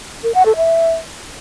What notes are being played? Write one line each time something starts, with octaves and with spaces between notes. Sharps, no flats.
A#4
F#5
A4
E5